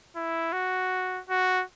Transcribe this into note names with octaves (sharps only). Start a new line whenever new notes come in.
E4
F#4
F#4